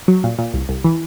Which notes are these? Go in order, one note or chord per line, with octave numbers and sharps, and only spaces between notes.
F#3
A#2
A#2
C2
C2
E3